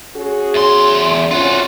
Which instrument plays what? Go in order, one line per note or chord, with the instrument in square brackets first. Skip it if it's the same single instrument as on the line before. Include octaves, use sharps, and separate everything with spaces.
[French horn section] C#4 F#4 G#4
[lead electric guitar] E2 C6
[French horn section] F2 C#4 [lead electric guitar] F4 F#4